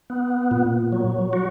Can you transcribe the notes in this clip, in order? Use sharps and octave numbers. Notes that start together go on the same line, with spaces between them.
B3
A#2
F#3
F#4